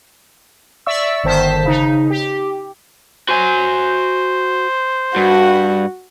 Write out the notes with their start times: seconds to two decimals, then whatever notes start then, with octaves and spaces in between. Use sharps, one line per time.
0.86 D5 E5 C#6 E6
1.24 G1 D#3 C5 A5 B6
1.64 C#3 D#4
2.10 G4
3.29 F#4 C5 G#5
5.16 G2 F#4